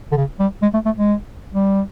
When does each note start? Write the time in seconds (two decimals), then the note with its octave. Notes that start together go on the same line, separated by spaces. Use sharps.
0.12 D3
0.17 C#3
0.40 G3
0.62 G#3
0.74 A3
0.86 A3
0.97 G#3
1.54 G3